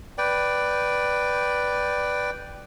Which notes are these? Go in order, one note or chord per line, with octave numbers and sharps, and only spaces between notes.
B4 D5 G5